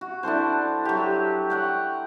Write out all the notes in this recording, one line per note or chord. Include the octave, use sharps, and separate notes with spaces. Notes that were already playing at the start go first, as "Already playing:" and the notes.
F#4
D4 E4 A4 C5
F#3 G4
C#5 F#5 G5